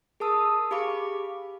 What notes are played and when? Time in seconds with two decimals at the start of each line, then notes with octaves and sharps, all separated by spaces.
0.20 G#4 A#4 A5 D#6 E6
0.71 G4 G#4 F5 B5 D6